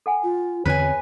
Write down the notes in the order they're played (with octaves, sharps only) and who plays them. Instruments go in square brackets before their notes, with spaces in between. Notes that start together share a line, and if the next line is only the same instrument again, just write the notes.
[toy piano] A4 F#5 G#5
[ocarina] F4
[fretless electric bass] E2 D3 C4 [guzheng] B4 G#5 [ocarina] C#5